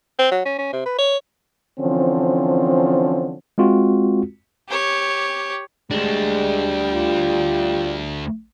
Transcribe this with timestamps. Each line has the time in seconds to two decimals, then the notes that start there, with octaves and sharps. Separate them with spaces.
0.19 C4
0.31 F#3
0.45 C#4
0.58 C#4
0.72 C3
0.86 B4
0.98 C#5
1.80 D3 E3 F3 C4 C#4
3.58 G#3 C4 F4 F#4
4.68 G4 C#5
5.91 D2 G3 G#3 D4
6.93 F4